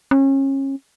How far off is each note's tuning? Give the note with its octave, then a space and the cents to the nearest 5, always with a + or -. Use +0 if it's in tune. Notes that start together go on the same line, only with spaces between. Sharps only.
C#4 -30